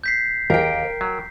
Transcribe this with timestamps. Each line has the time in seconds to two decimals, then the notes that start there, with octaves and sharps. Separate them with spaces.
0.04 G6 B6 C7
0.50 D#2 A#4 G5
1.01 F#3